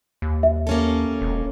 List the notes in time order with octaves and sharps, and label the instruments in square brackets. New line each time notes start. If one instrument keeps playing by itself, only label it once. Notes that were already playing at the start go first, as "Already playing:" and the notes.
[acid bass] D#2
[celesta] E5
[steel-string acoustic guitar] A#3 C#4 A4
[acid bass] E1